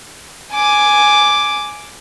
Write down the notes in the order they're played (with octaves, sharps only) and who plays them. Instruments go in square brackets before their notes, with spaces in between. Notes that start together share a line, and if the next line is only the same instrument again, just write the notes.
[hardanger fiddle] G#5 D6